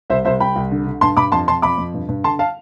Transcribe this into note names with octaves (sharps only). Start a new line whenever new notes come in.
C2 C5 E5
C2 C5 E5
C2 G5 B5
C2
D3
D3
G2 A5 C6
G2 B5 D6
F2 A5 C6
F2 A5 C6
F2 B5 D6
F2
G2
G2
D3 A5 C6
F5 A5